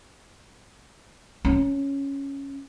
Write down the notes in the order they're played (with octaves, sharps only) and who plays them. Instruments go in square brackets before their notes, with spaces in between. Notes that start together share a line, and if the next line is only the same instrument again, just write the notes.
[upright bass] C#4